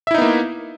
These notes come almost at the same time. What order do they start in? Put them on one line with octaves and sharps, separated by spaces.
E5 E4 D#4 B3 A#3